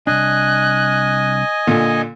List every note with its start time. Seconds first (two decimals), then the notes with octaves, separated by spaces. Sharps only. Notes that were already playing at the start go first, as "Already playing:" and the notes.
0.07 C2 G2 D4 D#5 G#5 F#6
1.67 A#2 D3